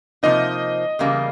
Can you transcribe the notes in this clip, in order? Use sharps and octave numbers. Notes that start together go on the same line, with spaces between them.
C3 F3 A#3 D#4 D#5
E2 C#3 G3 A#3